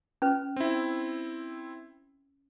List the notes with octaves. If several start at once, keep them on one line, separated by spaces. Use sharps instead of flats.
C#4 B4
C4 E4